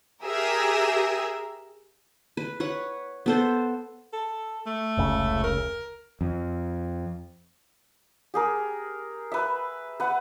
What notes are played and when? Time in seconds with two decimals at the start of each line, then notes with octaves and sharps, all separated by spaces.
0.23 G4 G#4 A#4 E5
2.37 B4
2.60 B4 C#5 F#5
3.26 B3 A4 C5
4.13 A4
4.66 A3
4.97 F1 C#2 C#3
5.44 A#4
6.21 F2
8.34 G4 G#4 A#4
9.32 B4 E5
10.00 B4 F#5